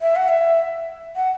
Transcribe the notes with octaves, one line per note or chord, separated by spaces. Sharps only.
E5
F#5
E5
F#5